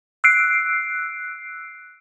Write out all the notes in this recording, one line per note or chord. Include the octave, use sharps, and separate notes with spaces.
E6 F#6 C7 D7